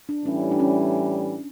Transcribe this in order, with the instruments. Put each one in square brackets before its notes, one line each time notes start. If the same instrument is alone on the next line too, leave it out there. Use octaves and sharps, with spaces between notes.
[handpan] D4
[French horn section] A2 E3 G3 [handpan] C#4
[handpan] D4
C#4